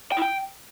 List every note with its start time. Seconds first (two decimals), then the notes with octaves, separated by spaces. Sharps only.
0.12 G5
0.17 E4
0.22 G5